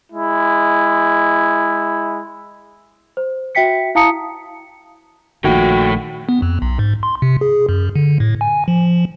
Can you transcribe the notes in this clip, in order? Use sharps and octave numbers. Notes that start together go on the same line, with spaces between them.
G#3 E4
C5
F#4 E5 G5 B6 C#7
E4 F5 A5 A#5 D#6 C#7
A#1 A#2 D#3 A3 F#4 G5
B3
F2
B1
G#2
C6
C3
G#4
F#2
D3
A2
G#5
F3